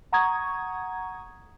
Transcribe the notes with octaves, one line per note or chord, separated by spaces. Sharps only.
F#5 A#5 C#6 D#6 G#6